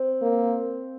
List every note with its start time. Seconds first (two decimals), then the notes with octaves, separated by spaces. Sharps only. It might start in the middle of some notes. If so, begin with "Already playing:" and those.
Already playing: C4
0.22 A#3